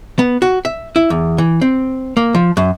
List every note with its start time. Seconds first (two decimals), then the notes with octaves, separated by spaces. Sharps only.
0.19 B3
0.42 F#4
0.65 E5
0.96 E4
1.10 E2
1.38 E3
1.61 C4
2.17 A#3
2.35 F3
2.57 F#2